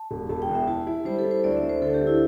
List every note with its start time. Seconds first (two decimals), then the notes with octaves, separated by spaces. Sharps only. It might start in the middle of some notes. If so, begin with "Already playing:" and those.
Already playing: A5
0.11 E1
0.29 E1 A5
0.42 G5
0.49 E2
0.55 E5
0.67 E4 A5
0.87 E4
1.05 G3 C5
1.19 A4
1.25 E4
1.31 C5
1.44 D2 D5
1.57 E5
1.63 D2
1.69 C5
1.82 D3 A4
1.94 G4
2.01 D2
2.07 E4